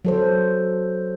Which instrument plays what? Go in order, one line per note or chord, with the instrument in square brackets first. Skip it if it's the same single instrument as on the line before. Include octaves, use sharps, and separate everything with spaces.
[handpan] F#3 A4 C5